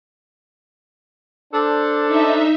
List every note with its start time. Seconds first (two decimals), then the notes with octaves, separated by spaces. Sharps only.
1.53 D4 A4 C5
2.08 D#4 E5